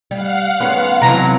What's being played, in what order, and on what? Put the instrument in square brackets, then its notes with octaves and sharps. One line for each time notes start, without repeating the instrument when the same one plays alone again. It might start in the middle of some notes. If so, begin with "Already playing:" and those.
[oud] G3 [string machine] F5 F#5
[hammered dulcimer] D#3 G#3 B3 [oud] C#4
[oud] C3 E3 F#3 [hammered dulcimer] A4 F5 [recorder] A#5